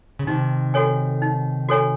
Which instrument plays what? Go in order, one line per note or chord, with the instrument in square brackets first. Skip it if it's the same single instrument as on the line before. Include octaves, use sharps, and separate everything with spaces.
[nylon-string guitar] C#3
[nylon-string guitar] C3 D#3 [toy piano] D#4
[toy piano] F#4 A4 C#5 G#5
D#4
F#4 A4 C#5 G#5